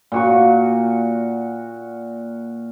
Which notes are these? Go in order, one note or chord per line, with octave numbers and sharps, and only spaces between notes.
A#2 F#4 C#6